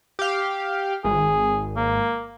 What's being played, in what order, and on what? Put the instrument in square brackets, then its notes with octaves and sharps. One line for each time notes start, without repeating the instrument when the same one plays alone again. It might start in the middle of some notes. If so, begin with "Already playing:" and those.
[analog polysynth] G4 F5
[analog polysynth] G#1 [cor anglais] G#4
[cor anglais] A#3